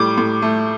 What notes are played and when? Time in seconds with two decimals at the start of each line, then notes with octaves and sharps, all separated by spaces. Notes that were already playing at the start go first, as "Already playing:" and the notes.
Already playing: A2 G3 D6
0.18 A2
0.42 A3